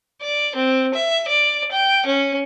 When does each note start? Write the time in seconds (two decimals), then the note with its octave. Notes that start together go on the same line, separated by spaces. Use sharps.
0.21 D5
0.55 C4
0.94 E5
1.28 D5
1.71 G5
2.06 C#4